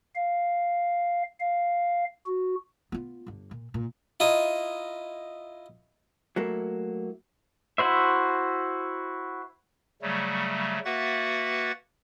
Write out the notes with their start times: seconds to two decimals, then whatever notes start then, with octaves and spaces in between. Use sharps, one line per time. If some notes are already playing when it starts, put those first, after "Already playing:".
0.15 F5
1.40 F5
2.26 F#4
2.92 B3 F4
3.27 G1 D3
3.51 A#2
3.74 A#2
4.20 E4 F4 D#5 A#5
6.36 F#3 A3 A#3 E4
7.78 E4 F#4 C5 E5
10.02 C#3 F#3 G3 A3
10.85 A#3 F#4 B4 E5 F#5 A6